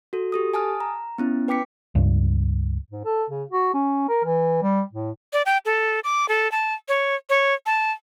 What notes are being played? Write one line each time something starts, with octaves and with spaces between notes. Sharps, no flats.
F#4 A4
G4 A4 D#6
G#5 A5 D#6 F6
A#5
B3 C#4 E4
B4 G5 D6 B6 C#7
C#2 G2
G#2
A4
C#3
F#4
C#4
A#4
E3
G3
A2
D5
G5
A4
D6
A4
A5
C#5
C#5
A5